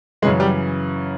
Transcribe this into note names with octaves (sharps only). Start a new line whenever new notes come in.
F#2 C#3 E3 G#3
G3